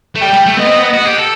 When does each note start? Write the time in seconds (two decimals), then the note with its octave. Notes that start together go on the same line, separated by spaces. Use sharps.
0.15 A3
0.21 G3 G5
0.33 G3
0.46 A3
0.57 B3 D#5
0.66 C4
0.76 B3
0.94 F#4
1.05 G4
1.17 A4